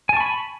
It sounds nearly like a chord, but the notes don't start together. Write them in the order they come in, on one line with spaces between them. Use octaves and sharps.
G#5 A5 C#6 B5